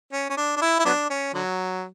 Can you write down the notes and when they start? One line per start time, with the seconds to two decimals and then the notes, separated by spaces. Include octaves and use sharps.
0.12 C#4
0.29 C#4
0.37 D4
0.56 D4
0.61 E4
0.79 E4
0.85 F#3 B3 D4
1.10 C#4
1.34 D3 F#3